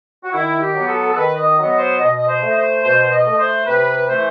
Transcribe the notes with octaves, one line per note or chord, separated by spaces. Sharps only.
F#4
D#3 E4
G4
F#3 B3
A4
A4
D#3 B4
D#5
F#3 B3 D#5
C5
B2 D#5
D#5
C5
A3
D#5
C5
B2 C5
C5
D#5
A3
C5
C3 B4
E3 A3 C5